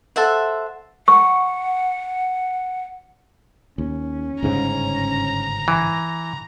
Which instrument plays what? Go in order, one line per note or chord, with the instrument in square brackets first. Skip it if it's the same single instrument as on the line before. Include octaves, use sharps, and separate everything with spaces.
[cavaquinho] A4 C5 E5 F#5
[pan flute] F#5 [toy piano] C#6
[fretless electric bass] D#2 [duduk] C#4
[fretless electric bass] G1 G#2 C#3 [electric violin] A#5
[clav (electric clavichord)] E3